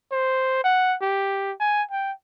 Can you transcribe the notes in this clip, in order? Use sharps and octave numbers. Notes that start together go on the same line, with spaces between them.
C5
F#5
G4
G#5
G5